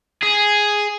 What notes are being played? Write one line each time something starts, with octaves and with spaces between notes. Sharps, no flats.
G#4